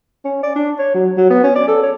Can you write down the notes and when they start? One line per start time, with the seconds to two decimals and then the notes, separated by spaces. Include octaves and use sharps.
0.25 C#4
0.43 D5
0.55 D4
0.78 C#5
0.94 F#3
1.17 F#3
1.30 B3
1.44 C#4
1.55 D5
1.68 A4
1.83 C#5